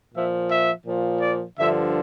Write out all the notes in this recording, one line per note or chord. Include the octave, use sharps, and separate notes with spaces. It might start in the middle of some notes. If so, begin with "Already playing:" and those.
A#2 F3 E5
E5
A#2 F3
D5
G2 D3 F3 E5